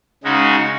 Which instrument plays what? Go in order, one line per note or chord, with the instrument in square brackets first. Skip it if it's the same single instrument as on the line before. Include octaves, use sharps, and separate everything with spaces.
[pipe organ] C#3 G#3 D#4 F#4